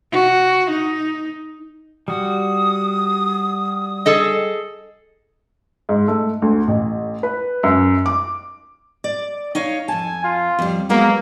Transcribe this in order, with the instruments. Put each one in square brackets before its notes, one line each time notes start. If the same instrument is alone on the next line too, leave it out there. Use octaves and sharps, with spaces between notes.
[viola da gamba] F#4
D#4
[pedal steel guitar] G3 F#4 [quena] D#6
[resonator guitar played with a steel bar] G#4 A4 D#5
[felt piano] G#2
A3
D2
A1
B4
F#2
D6
[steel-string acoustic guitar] D5
D#4 C#5 F5
[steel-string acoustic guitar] F2 A5 [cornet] G#5
[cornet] F4
[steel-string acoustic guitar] F2 G3
[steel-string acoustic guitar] F#3 G#3 B3 [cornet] A#3